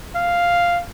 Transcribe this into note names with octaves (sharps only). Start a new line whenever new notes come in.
F5